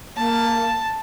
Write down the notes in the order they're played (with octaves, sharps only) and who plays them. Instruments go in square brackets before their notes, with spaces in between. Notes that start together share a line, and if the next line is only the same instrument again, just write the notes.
[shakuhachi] A#3 [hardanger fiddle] A5